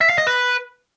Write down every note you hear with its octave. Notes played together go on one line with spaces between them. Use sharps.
E5
F5
D#5
B4